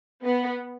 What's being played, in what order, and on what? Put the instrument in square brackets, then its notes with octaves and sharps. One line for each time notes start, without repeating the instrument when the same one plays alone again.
[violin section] B3